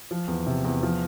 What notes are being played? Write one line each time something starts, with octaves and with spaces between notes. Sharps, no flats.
F3
E2
C3
E2
F3